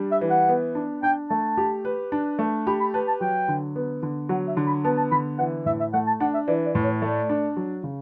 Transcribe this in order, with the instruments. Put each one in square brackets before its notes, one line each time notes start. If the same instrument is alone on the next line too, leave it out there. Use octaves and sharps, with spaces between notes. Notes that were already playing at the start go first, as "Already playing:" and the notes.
Already playing: [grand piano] G3 D4
[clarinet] E5
[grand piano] E3
[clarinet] F#5
[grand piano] B3
D4
[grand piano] D4 [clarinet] G5
[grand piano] A3 [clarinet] A5
[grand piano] G4
B4
D4
A3
[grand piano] G4 [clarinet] B5
[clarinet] B5
[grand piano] B4 [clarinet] A5
[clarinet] A5
[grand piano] F#3 [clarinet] G5
[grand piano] D3
B3
D3
[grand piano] F#3 [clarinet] F#5
[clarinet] E5
[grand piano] D3
[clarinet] B5
[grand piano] B3 [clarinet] A5
[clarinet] A5
[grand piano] D3 [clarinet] B5
[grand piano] E3 [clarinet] F#5
[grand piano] A2 [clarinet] E5
[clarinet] E5
[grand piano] A3 [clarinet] F#5
[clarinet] A5
[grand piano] D4 [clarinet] F#5
[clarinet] E5
[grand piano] E3 [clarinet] D5
[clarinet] D5
[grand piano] A2
[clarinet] C#5
[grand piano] A3 [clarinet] D5
[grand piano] D4
F#3
C#3